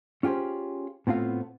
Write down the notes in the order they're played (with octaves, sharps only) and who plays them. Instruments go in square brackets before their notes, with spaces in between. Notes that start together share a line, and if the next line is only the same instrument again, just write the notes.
[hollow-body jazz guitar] C#4 F4 G4 G#4 C5
A2 B3 C4 F4 F5